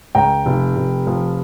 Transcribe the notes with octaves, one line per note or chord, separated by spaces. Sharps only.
C#2 G5 A#5
F1
F1
F3